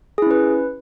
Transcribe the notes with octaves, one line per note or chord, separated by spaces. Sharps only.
C#4 E4 G#4 B4